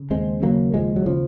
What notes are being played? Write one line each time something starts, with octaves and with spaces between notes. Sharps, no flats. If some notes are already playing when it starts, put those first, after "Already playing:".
Already playing: C#3
D#2 G#3 C4
C#3 F#3 A#3
D#2 F3 G#3
F#3
C#3 F3